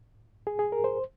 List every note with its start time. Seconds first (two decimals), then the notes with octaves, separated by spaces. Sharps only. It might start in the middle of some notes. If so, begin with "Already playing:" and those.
0.47 G#4
0.59 G#4
0.72 A#4
0.84 C5